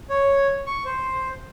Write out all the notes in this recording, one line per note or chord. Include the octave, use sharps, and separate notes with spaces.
C#5
C#6
C5